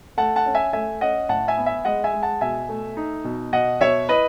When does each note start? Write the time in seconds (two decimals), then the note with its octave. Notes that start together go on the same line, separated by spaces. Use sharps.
0.17 A3 F#5 A5
0.36 F#5 A5
0.46 C#4
0.55 E5 G#5
0.73 A3 E5 G#5
1.01 C#4 D#5 F#5
1.29 A2 F#5 A5
1.48 E5 G#5
1.57 B3
1.66 E5 G#5
1.85 G#3 D#5 F#5
2.04 E5 G#5
2.13 G#3
2.23 F#5 A5
2.41 B2 E5 G#5
2.69 A3
2.97 D#4
3.24 B2
3.53 B2 D#5 F#5
3.81 B2 C#5 E5
4.09 E4 B4 D#5